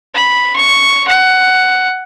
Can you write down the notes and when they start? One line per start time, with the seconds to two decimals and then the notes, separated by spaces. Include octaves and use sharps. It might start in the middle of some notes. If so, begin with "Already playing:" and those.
0.14 B5
0.56 C#6
1.07 F#5